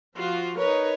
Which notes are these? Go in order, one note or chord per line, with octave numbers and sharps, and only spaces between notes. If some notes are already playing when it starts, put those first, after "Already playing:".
F3 F4 F#4
D#4 A#4 B4 C#5